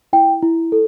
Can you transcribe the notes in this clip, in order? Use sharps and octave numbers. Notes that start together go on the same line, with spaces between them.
E4 G5
E4
A4